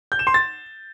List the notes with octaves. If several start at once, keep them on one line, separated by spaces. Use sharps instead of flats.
G6
E7
C6
A6